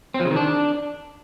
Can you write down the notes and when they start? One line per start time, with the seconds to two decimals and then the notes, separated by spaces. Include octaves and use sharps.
0.14 C4
0.20 F3
0.25 C#3
0.31 D#3
0.36 D4